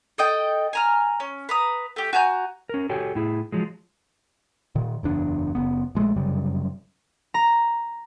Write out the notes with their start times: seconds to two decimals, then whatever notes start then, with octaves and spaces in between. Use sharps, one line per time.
0.18 A4 D#5 G5
0.73 G#5 A#5 F6
1.20 C#4
1.49 B4 A#5 D#6
1.96 A3 G4
2.13 F#4 G#5 A#5 G6
2.69 C#4 A#4
2.89 F#4 G4 A4 C#5 G5 G#5
3.15 A2 E4 G#4
3.52 F3 F#3 G#3
4.75 A#2 D#3
5.03 F#1 E2 D4
5.55 F#1 B3
5.95 A#1 G#3 A3
6.16 F1 F#2 C#3 G3
7.34 A#5